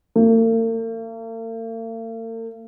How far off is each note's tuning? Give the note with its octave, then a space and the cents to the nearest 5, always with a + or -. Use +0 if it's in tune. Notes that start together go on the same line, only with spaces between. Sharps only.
A#3 -45